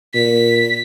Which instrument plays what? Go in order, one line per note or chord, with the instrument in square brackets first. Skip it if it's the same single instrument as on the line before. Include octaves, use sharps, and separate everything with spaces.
[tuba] A#2 [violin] B6